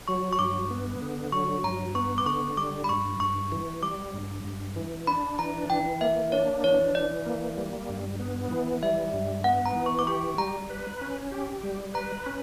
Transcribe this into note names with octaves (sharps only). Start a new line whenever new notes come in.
F#3 C#6
C#6
G2 D6
B3
D3
F#3 C#6
G2 A#5
B3 C#6
D6
D3 C#6
G3 D6
B5
G2 C#6
G2 C#6
E3
G3 D6
G2
G2
E3
D4 B5
E3 A#5
E3 G5
A#3 E5
D4 C#5
E3 C#5
E3 D5
A#3
G3
G2
B3
E3
G3 E5
G2
B3 F#5
A#5
E3
C#6
D6
G4 C#6
G3 A#5
B4
C#4
G4
G3
B4 A#5
C#4